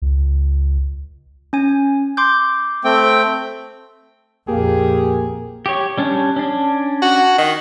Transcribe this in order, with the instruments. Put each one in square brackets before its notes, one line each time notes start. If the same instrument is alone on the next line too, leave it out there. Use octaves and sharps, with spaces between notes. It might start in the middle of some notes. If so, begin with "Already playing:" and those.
[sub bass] C#2
[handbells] C#4 G#5
C6 D6 G6
[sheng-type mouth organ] A3 C4 G5
[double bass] A#1 F2 [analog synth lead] A#3 [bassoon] G4 [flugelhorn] G#4
[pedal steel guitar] G4 C#5
G3 C#4 D4
C#4 D4
[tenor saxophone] F#4
D#3